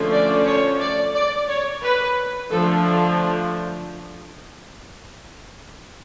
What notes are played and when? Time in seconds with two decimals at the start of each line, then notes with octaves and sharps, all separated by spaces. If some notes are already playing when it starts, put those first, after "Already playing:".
Already playing: D3 F3 A3 C#4
0.12 D5
0.45 C#5
0.80 D5
1.14 D5
1.48 C#5
1.82 B4
2.51 D3 F3 A3 D4 A4